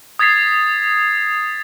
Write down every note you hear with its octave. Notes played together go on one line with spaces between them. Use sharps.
D#6 G#6 A6 B6 C7